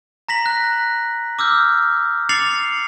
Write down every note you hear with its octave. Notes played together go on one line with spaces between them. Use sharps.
A#5 A#6 B6 F#7
F#6
D6 E6 F6 G6
D6 A6 C7 C#7 F7 F#7